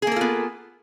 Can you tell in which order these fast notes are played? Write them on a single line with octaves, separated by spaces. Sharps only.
G#4 A#3 A4 F4 B3